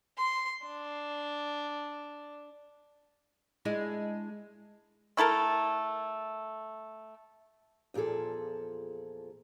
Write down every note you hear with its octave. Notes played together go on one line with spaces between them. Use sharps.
C6
D4
G#3 D4 E4
A3 E4 A4 A#4
E2 A#2 F3 G#4 A4